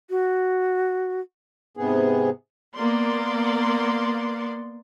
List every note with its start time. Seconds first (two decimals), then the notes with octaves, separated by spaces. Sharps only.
0.10 F#4
1.77 G#2 C3 B3 G#4
2.74 A#3 B3 D5 C6